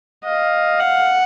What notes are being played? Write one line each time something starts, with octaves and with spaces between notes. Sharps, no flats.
D#5 F5
F#5